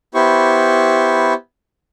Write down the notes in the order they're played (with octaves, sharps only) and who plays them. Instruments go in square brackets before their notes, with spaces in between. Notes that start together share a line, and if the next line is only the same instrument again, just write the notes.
[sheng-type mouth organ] B3 E4 G4 C5 C#6